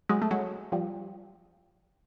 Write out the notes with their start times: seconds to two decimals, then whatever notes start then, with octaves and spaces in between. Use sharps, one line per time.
0.09 F#3 G#3
0.22 A3
0.31 F#3 G#3
0.72 F3 G3